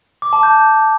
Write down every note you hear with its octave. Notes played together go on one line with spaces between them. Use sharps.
D6
A5
G6